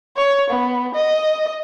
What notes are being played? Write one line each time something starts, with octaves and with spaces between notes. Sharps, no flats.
C#5
B3
D#5